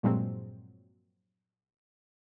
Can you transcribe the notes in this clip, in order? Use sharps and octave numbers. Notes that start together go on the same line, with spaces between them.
G2 A#2 F3 F#3 G#3 C4